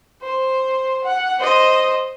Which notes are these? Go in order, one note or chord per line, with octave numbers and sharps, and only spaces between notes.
C5
F#5
C5 D#5